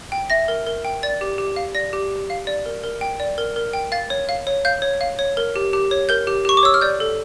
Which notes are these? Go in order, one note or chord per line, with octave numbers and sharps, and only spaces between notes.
G5
E5 A#6
A#4
A#4
G5
D5 A6
G4
G4
F5
D5 A#6
G4
G4
F5
D5
A#4
A#4
G5
D5
A#4
A#4
G5
F5 A6
C#5
F5
C#5
F5 G6
C#5
F5
C#5
A#4
G4
G4
C#5
A#4 G6
G4
G4 C#6
D6
C#5 E6
F6
D5 G6
A4